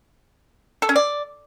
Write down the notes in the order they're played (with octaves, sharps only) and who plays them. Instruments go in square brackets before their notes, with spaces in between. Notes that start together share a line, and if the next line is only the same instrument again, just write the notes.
[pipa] A4
C#4
D5